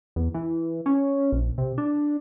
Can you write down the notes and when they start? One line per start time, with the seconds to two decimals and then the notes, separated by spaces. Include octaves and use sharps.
0.16 E2
0.34 E3
0.86 C#4
1.32 A#1
1.58 C3
1.78 D4